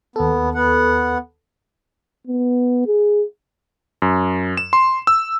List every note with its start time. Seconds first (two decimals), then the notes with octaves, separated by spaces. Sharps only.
0.16 D#2 B3 A4
0.54 B3 F#5
2.27 B3
2.87 G#4
4.02 F#2
4.57 E7
4.73 C6
5.07 E6